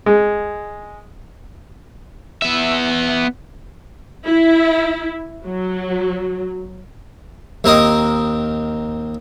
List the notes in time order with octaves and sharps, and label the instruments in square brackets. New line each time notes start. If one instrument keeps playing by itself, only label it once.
[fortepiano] G#3
[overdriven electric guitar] B3 E5
[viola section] E4
F#3
[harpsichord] D#2 C4 A#4 D#5